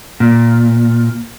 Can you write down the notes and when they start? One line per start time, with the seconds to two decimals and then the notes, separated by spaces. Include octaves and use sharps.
0.20 A#2